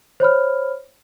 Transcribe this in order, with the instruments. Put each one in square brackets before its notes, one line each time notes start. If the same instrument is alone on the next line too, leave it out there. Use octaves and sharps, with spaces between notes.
[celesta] C5 C#5 B5 F6